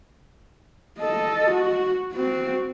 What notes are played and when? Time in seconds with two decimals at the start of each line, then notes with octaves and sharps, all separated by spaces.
0.99 A4 D#5
1.51 F#4
2.12 C4 F#4